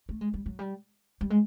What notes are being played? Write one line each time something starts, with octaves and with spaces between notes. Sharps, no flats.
A3
G#3
G3
F#3
G3
G3
G#3